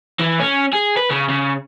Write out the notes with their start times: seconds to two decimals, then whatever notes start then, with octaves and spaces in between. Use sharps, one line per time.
0.19 E3
0.39 C#4
0.73 G#4
0.97 B4
1.10 C#3
1.29 C#3